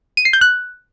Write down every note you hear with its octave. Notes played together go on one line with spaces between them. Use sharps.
D#7
C7
G6
F#6